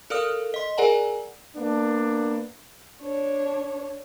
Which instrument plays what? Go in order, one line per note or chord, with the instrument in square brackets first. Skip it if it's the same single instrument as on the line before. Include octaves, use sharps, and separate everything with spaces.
[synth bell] A4 A#4 D5 F5 D#6 F6
D#5 C6
G#4 A#4 D5 F#5 G#5 A#5
[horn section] A#3 B3 D4
[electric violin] D4 C#5